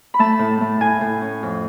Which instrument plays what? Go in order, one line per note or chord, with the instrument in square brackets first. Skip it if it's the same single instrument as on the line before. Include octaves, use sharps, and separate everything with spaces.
[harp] B5
A3 A5
A2
A3
A2 G#5
A2
C#4
F2